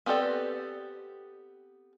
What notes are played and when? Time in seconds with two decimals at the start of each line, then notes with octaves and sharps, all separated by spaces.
0.06 B3 C4 G4 A4 D5